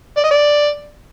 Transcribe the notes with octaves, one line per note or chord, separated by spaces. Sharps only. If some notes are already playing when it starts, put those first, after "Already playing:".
D5
D#5
D5